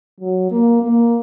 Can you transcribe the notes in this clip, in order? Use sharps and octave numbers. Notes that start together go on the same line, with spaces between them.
F#3
A#3
A#3